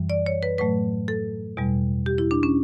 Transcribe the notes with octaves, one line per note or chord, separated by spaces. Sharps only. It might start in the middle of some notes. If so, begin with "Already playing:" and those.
Already playing: F#2 E3 G3
D5
C#5
B4
A2 F#3 A3 B4
A4
E2 B2 G3
G4
E4
D4
C#4